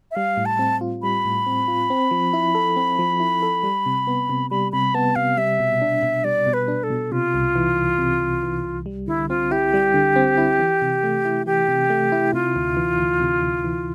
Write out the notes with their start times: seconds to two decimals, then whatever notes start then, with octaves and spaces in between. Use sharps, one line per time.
0.11 E5
0.15 G3 F5
0.37 A2
0.46 A5
0.59 C4
0.81 F4
1.02 G3 B5
1.25 A2
1.46 C4
1.68 F4
1.90 C4
2.11 F3
2.33 E4
2.55 A4
2.77 C4
2.99 F3
3.20 E4
3.42 A4
3.63 G3
3.86 C3
4.07 B3
4.30 C3
4.50 G3 B5
4.72 C3 B5
4.94 B3 A5
5.16 C3 F5
5.37 G3 E5
5.60 B2
5.82 D4
6.03 B2
6.24 G3 D5
6.46 B2
6.54 B4
6.68 D4
6.83 A4
6.90 B2
7.12 C3 F4
7.34 C2
7.56 E3
7.77 C2
7.98 C3
8.21 C2
8.43 E3
8.64 C2
8.86 G3
9.07 D3 E4
9.29 C4 F4
9.51 E4 G4
9.73 G3
9.94 D3
10.16 C4
10.37 E4
10.59 E3
10.82 C3
11.03 A3
11.25 E4
11.46 E3 G4
11.68 C3
11.90 A3
12.12 E4
12.33 C3 F4
12.56 D2
12.77 E3
12.98 D2
13.20 C3
13.43 D2
13.64 E3